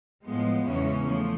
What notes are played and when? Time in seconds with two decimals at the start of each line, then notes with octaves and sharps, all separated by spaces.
0.24 A2 F3 G#3 B3
0.65 E2 C#3 E3 G#3 C#4
1.07 F3 A3